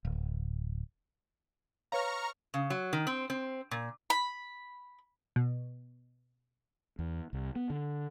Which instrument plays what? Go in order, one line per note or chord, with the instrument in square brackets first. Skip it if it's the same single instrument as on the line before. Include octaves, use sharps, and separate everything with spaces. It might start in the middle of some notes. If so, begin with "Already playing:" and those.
[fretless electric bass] D1
[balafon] B4 C#5 F5 [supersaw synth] A#5 C#6 F6
[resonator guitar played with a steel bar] C#3
F#3
D#3
C4
C4
A#2
[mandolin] B5
[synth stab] B2
[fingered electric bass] E2
C2
B3
D3